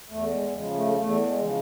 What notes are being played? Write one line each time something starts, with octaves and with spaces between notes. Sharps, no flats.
E2 A3
G#3
C#3 F3 G#3
A3
E2 A3
G#3
C#3 F3